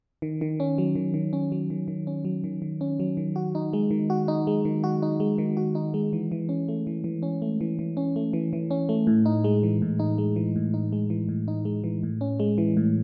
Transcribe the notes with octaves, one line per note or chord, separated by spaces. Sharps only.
D#3
D#3
C#4
F#3
D#3
D#3
C#4
F#3
D#3
D#3
C#4
F#3
D#3
D#3
C#4
F#3
D#3
F#4
D#4
G#3
D#3
F#4
D#4
G#3
D#3
F#4
D#4
G#3
D#3
F#4
D#4
G#3
E3
E3
C#4
A3
E3
E3
C#4
A3
E3
E3
C#4
A3
E3
E3
C#4
A3
A2
D#4
G#3
E3
A2
D#4
G#3
E3
A2
D#4
G#3
E3
A2
D#4
G#3
E3
A2
C#4
G#3
E3
A2